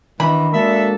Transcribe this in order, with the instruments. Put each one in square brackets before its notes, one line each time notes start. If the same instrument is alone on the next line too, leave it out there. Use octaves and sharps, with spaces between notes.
[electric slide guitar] D#3 D4 D#5 [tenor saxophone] E3 [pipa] B5
[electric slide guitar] G#3 F#4 [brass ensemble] A#3 D4 A4 [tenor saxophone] E5